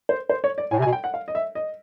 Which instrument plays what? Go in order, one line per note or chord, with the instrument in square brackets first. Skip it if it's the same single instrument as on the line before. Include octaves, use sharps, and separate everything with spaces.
[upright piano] C5
C5
C#5
D5
[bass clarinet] A2 [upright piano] G#5
[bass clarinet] C3
[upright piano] G#5
[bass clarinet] B2
[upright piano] G5
F#5
F5
D#5
E5
D#5